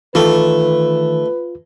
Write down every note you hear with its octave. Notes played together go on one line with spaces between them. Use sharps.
D#3 E3 A3 F4 B4